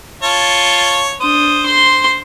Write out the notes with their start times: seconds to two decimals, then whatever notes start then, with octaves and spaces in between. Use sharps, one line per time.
0.22 F4 C#5 A5
1.21 D4 C5 D#6
1.66 C6